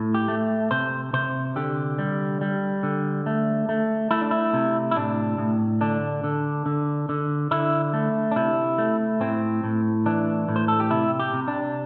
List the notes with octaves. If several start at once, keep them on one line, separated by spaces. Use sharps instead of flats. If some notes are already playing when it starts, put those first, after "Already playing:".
Already playing: A2
G4
A3
C3 C5
C3 C5
D3 G4
G3
G3
D3
A3
A3
A3 E4
D4
E4
C3
E4
A2 D4
A2
D3 D4
D3
D3
D3
D3 E4
A3
D4
C3 E4
A3
A2 C4
A2
E3 D4
A2
C5
A4
G4
C3 E4
G4
C3
D4